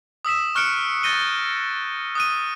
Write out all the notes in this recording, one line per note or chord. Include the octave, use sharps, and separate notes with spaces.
D#6 E6 B6 E7
C#6 F6 F#6 C#7 D7
G6 A6 A#6 D#7 G7
D#6 F#6 D#7